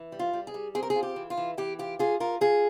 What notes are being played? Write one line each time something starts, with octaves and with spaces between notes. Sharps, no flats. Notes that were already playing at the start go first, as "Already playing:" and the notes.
Already playing: E3
G3
F4
G3
G#4
G3
C4 G#4
A#4
G#4
F4
G4
E3
F4
E3
E3 G4
F4 G4
F4 G#4
F4 A#4
F4 G#4